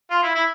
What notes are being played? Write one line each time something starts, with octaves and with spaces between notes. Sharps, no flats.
F4
E4
E4